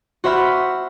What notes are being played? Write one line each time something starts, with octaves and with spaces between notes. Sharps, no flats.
F#4 C5 E5 B5 F6